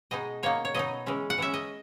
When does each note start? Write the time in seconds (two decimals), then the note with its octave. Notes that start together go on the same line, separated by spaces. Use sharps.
0.11 B2 G#3 D#4 D#5
0.43 B2 A#3 D#4 C#5
0.65 C#5
0.74 B2 F#3 B3 D#4 D#5
1.06 E3 G#3 C#4
1.30 F#5
1.38 E3 G#3 C#4 E5
1.54 D#5